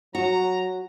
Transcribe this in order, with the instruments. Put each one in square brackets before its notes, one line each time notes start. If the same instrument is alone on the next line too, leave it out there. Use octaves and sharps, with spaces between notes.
[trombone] F#3 [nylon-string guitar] F#4 [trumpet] A#5